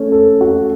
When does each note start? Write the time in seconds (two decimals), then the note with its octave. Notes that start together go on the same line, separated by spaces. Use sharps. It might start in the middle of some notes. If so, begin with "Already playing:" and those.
Already playing: A3 C#4
0.12 A4
0.41 F#4